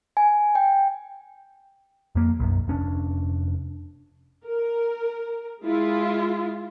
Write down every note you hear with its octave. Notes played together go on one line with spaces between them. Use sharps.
G#5
G5
F2 A#3
B1 F#2
F1 C#4 D4
A#4
G#3 E4 F4